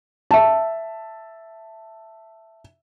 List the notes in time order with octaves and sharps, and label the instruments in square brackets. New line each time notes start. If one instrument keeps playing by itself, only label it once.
[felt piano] E5 A5